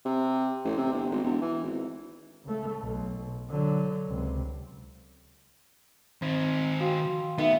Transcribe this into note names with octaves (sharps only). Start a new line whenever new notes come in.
C3
A1
C3
G1
G#1
E1
E3
G#1
C#3 A3
B1 B2
D3 F#3
C#2 C3
D#3 C4 C5 D#5
F#4 F5 G5 C6
D#2 A3 B3 D#4 E5